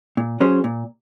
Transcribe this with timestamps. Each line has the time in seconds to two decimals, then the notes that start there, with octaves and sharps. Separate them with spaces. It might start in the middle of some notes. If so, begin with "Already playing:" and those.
0.17 A#2
0.40 F#3 C#4 G#4 C5
0.64 A#2